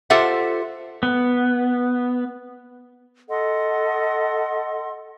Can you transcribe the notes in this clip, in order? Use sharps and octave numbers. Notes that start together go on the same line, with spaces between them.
F4 G4 A4 C5 E5 F#5
B3
A4 D#5 F#5 C6